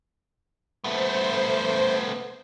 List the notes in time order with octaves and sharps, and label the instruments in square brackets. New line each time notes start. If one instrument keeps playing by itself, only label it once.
[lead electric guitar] A3 B3 [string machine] C5